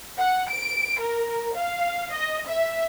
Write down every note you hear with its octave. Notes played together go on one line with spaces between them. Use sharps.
F#5
D7
A#4
F5
D#5
E5